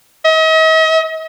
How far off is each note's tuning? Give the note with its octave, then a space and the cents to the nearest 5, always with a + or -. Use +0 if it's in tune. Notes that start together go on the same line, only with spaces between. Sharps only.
D#5 +45